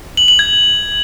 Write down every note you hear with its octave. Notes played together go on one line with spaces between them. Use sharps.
F#7
F#7
G#6